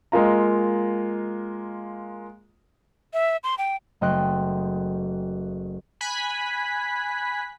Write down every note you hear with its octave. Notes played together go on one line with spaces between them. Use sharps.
G#3 A#3 F4 A#5
E5
C6
G5
F#1 A3 D#5 G5 C6 F#6
G#5 B5 F#6 B6